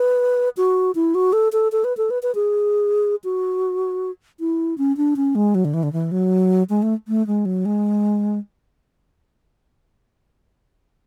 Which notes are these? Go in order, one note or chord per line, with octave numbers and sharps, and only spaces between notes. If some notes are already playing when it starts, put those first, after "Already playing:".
Already playing: B4
F#4
E4
F#4
A4
A4
A4
B4
A4
B4
B4
G#4
F#4
E4
C#4
D4
C#4
G#3
F#3
D3
E3
D3
E3
F#3
G#3
A3
A3
G#3
F#3
G#3